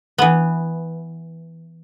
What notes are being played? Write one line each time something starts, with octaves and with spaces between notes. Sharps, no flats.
E3 B3